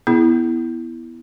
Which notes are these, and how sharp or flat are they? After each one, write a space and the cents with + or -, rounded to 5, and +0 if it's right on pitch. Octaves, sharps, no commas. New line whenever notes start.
B3 -5 E4 +0 G#4 +0